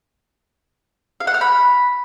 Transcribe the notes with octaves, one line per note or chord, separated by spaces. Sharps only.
F5
F#5
F6
B5